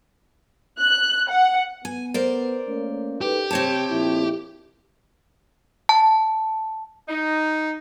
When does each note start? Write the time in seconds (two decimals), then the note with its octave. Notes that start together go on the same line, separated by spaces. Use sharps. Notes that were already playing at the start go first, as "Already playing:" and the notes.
0.80 F#6
1.30 F#5
1.85 B3 G#5
2.14 A#4 C5 D5
2.67 A3 A#3 C#4
3.21 D#4 G4 A4 B4
3.51 C3 C4 C#5 A5
3.90 A#1 F2 E4
5.89 A5
7.09 D#4